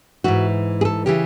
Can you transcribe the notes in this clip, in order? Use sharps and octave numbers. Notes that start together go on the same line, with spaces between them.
G#2 E3 F#4
G#4
A4
C#3 E3 G4